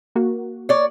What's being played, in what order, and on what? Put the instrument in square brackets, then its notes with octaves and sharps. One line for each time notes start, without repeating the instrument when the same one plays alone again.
[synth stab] A#3 F#4
[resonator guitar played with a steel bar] C#5 D5